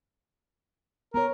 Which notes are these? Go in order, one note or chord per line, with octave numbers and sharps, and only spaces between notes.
B3 A#4 C#5